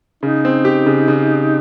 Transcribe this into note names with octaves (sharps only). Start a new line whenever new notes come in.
C#3 D#4
C4
G4
C#3
C#3